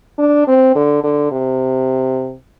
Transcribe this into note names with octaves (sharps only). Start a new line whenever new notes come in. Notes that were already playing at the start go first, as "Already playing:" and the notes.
D4
C4
D3
D3
C3